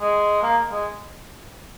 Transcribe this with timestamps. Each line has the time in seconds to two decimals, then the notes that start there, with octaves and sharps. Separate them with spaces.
0.01 G#3
0.43 A#3
0.71 G#3